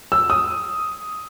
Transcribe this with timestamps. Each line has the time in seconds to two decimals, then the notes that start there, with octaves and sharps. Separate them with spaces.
0.12 E6
0.30 D#6